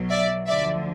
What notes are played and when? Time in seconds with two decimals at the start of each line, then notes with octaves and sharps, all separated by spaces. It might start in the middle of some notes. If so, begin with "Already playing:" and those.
Already playing: B1 B2 F#3
0.10 D5 E5
0.47 D2 D3 F3 D5 E5